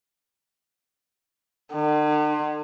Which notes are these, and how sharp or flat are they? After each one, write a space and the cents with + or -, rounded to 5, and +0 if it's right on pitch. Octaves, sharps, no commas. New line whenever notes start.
D3 +45